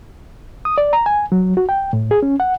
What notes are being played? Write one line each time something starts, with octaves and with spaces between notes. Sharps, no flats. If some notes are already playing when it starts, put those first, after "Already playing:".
D#6
D5
A#5
G#5
F#3
F#4
G5
A2
G#4
C#4
F#5